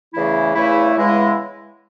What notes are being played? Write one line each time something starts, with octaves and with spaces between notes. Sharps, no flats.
E2 C#3 E3 A3 E4
E2 C#3 E3 A3 E4
C#3 E3 G#3 B3 E4